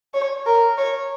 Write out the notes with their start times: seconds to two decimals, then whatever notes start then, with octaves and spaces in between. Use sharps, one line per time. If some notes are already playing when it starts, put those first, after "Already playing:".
0.14 C#5
0.46 A#4
0.78 C#5